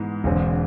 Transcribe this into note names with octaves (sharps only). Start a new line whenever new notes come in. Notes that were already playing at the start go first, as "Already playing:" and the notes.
Already playing: G#2 E3 G#3 B3
E1 E2 D3 G#3 C4